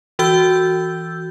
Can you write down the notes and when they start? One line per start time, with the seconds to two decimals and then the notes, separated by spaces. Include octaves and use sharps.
0.19 E3 F#4 E6 G6